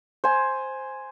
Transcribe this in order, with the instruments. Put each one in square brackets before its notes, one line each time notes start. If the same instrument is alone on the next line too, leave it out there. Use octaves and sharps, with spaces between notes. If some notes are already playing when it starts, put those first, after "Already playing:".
[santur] C5 G#5